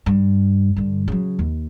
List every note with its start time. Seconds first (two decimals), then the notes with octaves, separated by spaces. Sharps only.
0.06 G2
0.76 G2 D3
1.08 C#3 F#3
1.39 D#2